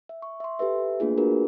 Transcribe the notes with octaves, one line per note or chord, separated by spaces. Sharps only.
E5
C#6
E5 C6
G4 A4 B4 E5
A3 A#3 D4 F4 G#4 B4
D4 F4 F#4 G#4 A#4 B4